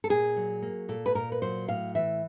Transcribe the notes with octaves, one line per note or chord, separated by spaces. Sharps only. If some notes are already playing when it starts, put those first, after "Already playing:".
A4
A#2 G#4
F#3
A#3
A#2 A4
B4
A#2 A#4
B4
F#3 C5
A2 F5
E3 E5